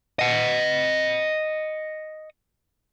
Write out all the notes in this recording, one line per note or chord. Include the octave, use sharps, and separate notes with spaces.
D#5 F#5